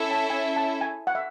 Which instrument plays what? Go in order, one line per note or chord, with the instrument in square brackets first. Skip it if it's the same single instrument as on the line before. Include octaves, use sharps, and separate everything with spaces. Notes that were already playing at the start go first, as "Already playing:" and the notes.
Already playing: [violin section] C#4 E4 A4 E5
[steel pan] A5
G#5
A5
G#5
F#5
E5